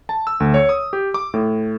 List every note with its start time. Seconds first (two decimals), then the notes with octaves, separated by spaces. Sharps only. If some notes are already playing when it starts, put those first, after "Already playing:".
0.09 A5
0.27 E6
0.40 D2
0.54 C#5
0.69 D#6
0.93 G4
1.14 D6
1.34 A2